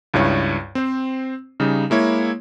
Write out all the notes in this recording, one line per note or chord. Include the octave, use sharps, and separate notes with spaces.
C#2 G2 E4 C#5
C4 C5
C#3 G3 D#4
G#3 A#3 E4 C#5